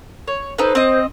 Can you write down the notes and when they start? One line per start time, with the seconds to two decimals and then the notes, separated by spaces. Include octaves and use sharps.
0.28 C#5
0.58 D#4 A4 B4 C5
0.75 C4 D#5